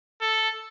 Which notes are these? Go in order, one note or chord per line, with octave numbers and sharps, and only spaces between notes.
A4